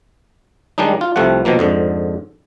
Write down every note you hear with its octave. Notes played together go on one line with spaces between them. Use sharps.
D#3 G3 G#3 D4 D#4
F4
C2 C3 F3 A3 F#5
B2 D#3 F3 A#3
F2 G#2 D3